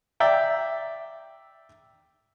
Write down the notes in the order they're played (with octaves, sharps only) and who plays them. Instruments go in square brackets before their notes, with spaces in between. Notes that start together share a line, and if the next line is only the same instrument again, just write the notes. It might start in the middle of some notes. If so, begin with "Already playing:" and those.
[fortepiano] D5 E5 G5 A#5